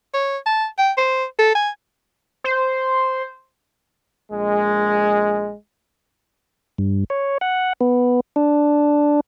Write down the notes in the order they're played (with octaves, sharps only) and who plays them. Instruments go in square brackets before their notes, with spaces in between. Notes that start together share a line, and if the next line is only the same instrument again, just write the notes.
[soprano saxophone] C#5
A5
G5
C5
A4
G#5
[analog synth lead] C5
[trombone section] A#1 G#3
[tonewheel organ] G2
C#5
F#5
B3
D4